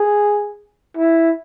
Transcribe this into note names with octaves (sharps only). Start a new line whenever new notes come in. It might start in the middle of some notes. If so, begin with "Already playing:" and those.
Already playing: G#4
E4